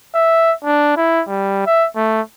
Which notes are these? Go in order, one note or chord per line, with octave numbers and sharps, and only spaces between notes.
E5
D4
E4
G3
E5
A3